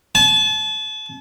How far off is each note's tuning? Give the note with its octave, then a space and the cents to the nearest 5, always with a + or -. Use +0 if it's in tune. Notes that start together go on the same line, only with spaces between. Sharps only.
A5 -35